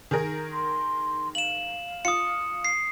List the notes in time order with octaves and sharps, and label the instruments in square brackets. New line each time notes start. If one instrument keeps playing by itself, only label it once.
[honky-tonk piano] D#3 G#4 A#4
[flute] C6
[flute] F5 [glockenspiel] E7 F#7
[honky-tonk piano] F4 [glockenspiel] D#6 C#7
[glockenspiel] C7